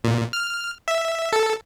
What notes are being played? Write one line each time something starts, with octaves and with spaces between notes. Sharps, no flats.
A#2
F6
E5
A4